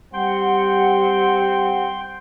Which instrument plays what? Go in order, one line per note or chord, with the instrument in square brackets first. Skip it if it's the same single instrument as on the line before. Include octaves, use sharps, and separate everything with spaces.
[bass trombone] G3 [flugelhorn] C4 [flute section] F#5 [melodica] G5 C6